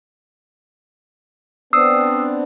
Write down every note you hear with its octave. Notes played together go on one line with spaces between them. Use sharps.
B3 C4 D4 D#6 E6 C7